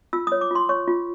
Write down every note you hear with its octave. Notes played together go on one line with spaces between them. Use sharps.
F4 E6
C#5 D#6
D6
F4 C6
C#5 C#6
F4